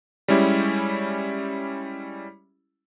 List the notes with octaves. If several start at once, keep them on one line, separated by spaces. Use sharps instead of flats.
G3 G#3 C#4 E4 G4